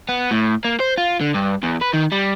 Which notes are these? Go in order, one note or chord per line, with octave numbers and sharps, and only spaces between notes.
B3
A2
A#3
C5
F4
D3
G2
E2
B4
D#3
G3